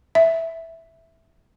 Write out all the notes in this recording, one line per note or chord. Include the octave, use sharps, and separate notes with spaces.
E5